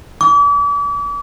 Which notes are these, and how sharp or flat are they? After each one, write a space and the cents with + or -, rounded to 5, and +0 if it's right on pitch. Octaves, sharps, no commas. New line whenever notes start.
D6 -40